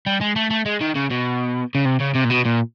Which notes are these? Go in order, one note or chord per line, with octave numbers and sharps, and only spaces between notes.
G3
G#3
A3
A3
G#3
D#3
C#3
B2
C#3
C3
C#3
C3
A#2
B2
A#2